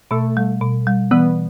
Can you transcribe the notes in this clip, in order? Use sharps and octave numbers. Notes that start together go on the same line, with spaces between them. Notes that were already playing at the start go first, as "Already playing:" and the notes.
B2 A3
G3
B2
G3
E3 B3